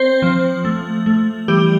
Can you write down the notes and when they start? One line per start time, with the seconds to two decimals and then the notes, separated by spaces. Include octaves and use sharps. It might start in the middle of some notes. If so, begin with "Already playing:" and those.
Already playing: C4 C5
0.22 F3
0.65 A3
1.06 A3
1.48 E3 G3 G4